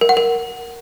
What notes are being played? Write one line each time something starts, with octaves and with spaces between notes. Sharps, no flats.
A#4
F#5
A#4